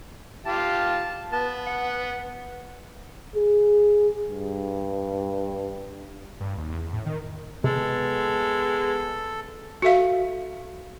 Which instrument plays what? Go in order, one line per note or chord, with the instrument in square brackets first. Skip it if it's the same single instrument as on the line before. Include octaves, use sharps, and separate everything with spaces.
[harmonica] F4 G4 F5 [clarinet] A5
[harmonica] B3 [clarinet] A5
[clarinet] F#5
[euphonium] G#4
G2
[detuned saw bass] G2
D#2
E2
A2
D#3
[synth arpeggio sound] C3 [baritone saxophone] G#3 [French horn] B3 [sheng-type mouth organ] A4
[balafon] F#4 A4 E5 F5